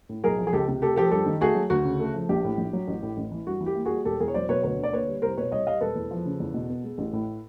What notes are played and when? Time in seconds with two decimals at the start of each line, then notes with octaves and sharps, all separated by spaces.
0.09 A2
0.24 B1 G#4 A#4
0.39 F3
0.47 G#4
0.53 C#2 G4 A4
0.68 C3
0.82 A3 G4 A4
0.96 F3 G4 A4
1.11 G2 G4 A4
1.26 D#3
1.41 A3 F#4 G#4
1.55 F#3
1.70 D2 F#4
1.85 C#3
2.00 A3
2.14 F3
2.29 A#1 G4
2.44 A2
2.58 A#1
2.73 F#3
2.88 A1
3.03 A2
3.17 A1
3.32 E3
3.47 G2 F#4
3.61 E3
3.66 G4
3.75 A#3
3.85 G3 F#4 G#4
4.05 E1 G4 A4
4.20 E2 G#4 A#4
4.28 C#5
4.34 F#3 C5 D5
4.49 B2 B4 C#5
4.63 D2 B4 C#5
4.79 D3 D5
4.93 A#3 B4 C#5
5.08 G3
5.22 C2 A#4 C5
5.37 B2 B4 C#5
5.52 C2 C#5 D#5
5.67 G3 D#5 F5
5.81 E1 A4 B4
5.96 E2
6.11 F3
6.26 C#3
6.40 E2
6.54 B2
6.69 B3
6.84 G#3
6.98 A1
7.13 A2